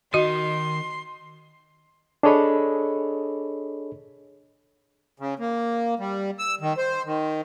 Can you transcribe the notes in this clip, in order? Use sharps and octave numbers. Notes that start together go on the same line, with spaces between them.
D#3 F#4 D#5 C6
D4 G#4 A4 C#5 D#5 B5
C#3
A#3
G3
E6
D#3
C5
D#3